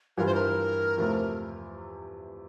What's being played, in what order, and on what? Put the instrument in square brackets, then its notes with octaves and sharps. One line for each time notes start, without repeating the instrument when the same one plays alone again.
[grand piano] G2 E3 G3 D4 F4 [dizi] A#4
[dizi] C5
A#4
[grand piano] E2 C3 F3 A3